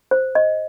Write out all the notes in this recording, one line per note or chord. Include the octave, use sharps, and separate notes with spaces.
C5
D#5